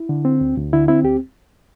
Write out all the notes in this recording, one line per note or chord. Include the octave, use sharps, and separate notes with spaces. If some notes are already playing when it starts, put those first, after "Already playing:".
Already playing: E4
D3
C4
D2
D2
D3 E4
C4 E4
D2 G4